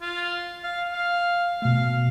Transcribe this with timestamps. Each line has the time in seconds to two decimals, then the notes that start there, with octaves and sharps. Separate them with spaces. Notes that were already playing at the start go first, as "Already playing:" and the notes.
0.01 F4
0.64 F5
0.93 F5
1.62 B2 A3 F5